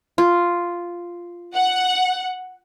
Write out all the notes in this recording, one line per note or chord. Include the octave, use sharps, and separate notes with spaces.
F4
F#5